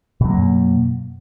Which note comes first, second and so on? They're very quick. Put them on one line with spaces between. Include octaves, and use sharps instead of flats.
B2 F#3 A#3 F#2